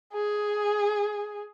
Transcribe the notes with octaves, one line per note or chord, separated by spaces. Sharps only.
G#4